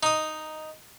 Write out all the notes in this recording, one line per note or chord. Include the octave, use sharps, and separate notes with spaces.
D#4 D#6